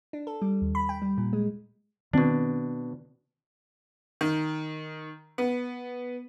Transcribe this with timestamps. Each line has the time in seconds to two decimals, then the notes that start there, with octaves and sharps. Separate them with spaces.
0.13 D4
0.27 A4
0.42 G3
0.62 D#2
0.75 B5
0.89 G5
1.02 G3
1.18 A#2
1.33 G#3
2.13 B2 D#3 C4 D4
4.21 D#3
5.38 B3